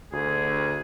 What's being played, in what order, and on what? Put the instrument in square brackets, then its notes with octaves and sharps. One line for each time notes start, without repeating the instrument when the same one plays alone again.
[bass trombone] D2 [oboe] G#4